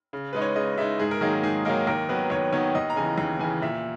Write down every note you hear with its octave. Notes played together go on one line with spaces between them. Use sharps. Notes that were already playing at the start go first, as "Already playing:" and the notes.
C#3
G#3 D#4 B4
C#5
C#3 D#5
G#3 D#4 E5
G#2 G#4
A#4
D#3 F#3 A#3 D#4 G#4
A#4
G#2 G#4
D#3 F#3 A#3 D#4 A#4
D#2 A#4
D#3 F#3 B3 B4
D#2 C#5
D#3 F#3 B3 C#5
D#2 D#5
A#5
C#3 E3 G#5
D#2 A#5
C#3 E3 G#5
A#2 E5